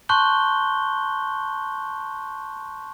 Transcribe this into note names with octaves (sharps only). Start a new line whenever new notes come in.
A5 C6 C#6 F#6 G6 G7